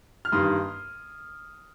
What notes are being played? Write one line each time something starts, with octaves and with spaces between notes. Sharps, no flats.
F6
G2 D#3 G3 A#3 C6 D#6